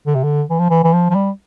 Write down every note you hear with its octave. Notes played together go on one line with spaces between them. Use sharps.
D3
C3
D3
E3
F3
E3
E3
F3
F3
G3